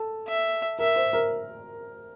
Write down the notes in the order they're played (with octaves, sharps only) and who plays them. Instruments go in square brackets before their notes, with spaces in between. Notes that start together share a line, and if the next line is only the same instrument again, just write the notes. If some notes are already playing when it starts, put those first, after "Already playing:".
Already playing: [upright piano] A4
[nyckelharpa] E5
[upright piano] A#4 [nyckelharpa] E5
[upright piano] C5
A#4